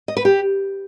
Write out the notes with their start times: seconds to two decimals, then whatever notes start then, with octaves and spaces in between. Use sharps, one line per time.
0.08 D#5
0.17 B4
0.25 G4